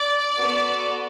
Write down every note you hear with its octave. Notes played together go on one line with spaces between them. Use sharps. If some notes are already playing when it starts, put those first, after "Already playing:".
Already playing: D5
B3 F#4 A4